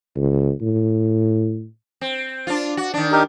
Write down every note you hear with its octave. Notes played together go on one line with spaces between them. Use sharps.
C#2
A2
C4
D4 F4
F#4
D#3 D4
D#4 G4 A#4